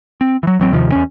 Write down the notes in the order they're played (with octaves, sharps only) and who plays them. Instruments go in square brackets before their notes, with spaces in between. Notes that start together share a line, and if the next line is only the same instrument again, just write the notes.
[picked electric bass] C4
E3 F#3
A1 F#3 C4
D#2 C3 D#3 F3
E2 C#4